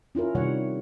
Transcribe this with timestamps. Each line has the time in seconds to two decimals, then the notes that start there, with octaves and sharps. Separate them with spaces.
0.15 C#4 E4 F4 A#4
0.35 C3 D#3 G3 C#5 F#5